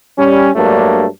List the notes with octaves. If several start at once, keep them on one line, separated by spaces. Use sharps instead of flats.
G3 C#4
G2 F#3 A3 A#3 D4